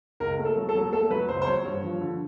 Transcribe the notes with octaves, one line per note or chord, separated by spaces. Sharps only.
C#2 A#4
A3
A4
F#3
A4
F#3
A3 A4
F#3 B4
C#2 C5
C5
F#3 C#5
G2 C#5
F3
D3